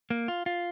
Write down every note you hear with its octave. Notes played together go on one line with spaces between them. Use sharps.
A#3
F4
F4